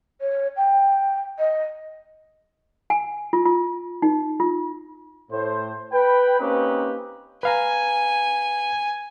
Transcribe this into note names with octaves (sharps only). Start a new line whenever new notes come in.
C#5
G5
D#5
G#5
F4
F4
D#4
F4
A2 C5
B4 G5 B5
A#3 C4 C#4 D#4 G4 B4
B4 F5 G#5 A#5